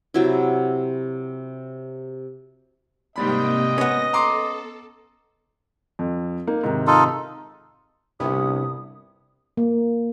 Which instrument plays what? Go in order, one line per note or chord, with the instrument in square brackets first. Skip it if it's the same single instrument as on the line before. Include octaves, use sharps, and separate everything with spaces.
[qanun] C3 F#3 E4
[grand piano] G#2 G3 B5 [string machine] C3 A#3 G5 [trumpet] D#5
[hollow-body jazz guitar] B3 C#4 [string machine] A#6
[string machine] A4 [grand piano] A#5 C6 D6
[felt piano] F2
A#3 D#4
G#2 C3 D#3
[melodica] D#4 F4 A4
[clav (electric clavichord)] G1 G2 E4 [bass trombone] C2 [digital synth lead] C3 [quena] D#6
[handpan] A#3